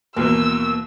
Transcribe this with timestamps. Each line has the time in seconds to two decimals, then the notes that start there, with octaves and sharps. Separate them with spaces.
0.16 D#2 B2 E3 A#3 E6